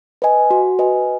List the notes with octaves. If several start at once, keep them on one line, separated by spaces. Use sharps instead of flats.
B4 D#5 G#5
F#4
B4 D#5 G#5